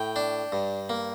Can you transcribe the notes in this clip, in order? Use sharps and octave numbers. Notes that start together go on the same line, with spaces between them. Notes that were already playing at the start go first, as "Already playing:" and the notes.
Already playing: A2 G5
D4
G2
A#3